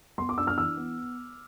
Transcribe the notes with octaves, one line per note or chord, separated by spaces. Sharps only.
B3 C6
D6
D4 E6
F6
E3 E6
B3